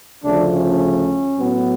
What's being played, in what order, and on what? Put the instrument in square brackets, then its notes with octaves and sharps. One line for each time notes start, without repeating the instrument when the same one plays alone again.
[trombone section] D2 C#3 F3 A3 D4
C#4
A2 F#3 B3